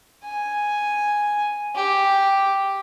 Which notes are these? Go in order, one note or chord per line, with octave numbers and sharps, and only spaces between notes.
G#5
G4